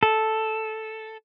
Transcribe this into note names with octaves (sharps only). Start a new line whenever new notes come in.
A4